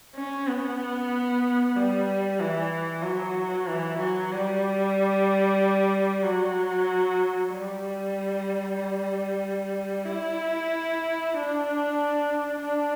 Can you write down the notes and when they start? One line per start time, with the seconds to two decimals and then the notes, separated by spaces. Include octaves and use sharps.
0.16 C#4
0.48 B3
1.76 G3
2.40 E3
3.03 F#3
3.67 E3
3.99 F#3
4.32 G3
6.23 F#3
7.50 G3
10.05 E4
11.33 D4
12.61 D4